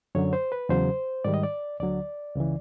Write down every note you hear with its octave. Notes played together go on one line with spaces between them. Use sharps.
F#2 D3 F#3 C#5
C5
B4
E2 C#3 F#3 C5
G#2 D#3 G3 D5
D#5
D5
D2 D3 F#3 D5
C#2 C#3 E3